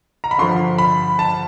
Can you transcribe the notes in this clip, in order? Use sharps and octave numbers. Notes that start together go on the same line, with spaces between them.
A#5
B5
G2 D3 F3 C6
B5
A5